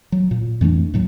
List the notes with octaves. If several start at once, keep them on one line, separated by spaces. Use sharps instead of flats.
F#3
A#2
F2 E3 A3 D4
D#2 A2 F#3